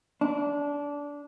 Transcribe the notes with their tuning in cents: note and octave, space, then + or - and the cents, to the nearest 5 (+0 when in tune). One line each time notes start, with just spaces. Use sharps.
D4 -20